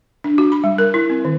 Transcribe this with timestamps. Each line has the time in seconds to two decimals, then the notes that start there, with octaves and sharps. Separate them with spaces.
0.24 D4
0.38 F#4
0.52 B5
0.64 G3
0.78 A#4
0.94 E4
1.10 C4
1.25 D#3